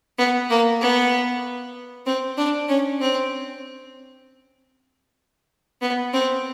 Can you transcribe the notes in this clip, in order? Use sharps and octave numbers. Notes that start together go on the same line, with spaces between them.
B3
A#3
B3
C4
D4
C#4
C4
B3
C4